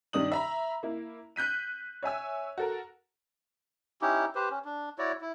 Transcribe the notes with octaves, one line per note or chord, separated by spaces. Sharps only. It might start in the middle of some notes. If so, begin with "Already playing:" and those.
G2 D#3 D4 D#6 F#7
E5 A#5 B5
A#3 E4
F#6 G6 B6 D#7
C#5 E5 G#5 E6
F#4 A4 A#4
C#4 D#4 E4 G4
G4 B4 C5
C#4
D4
E4 F#4 C#5 D5
E4